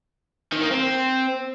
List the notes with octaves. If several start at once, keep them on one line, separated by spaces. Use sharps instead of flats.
D#3
A#3
C4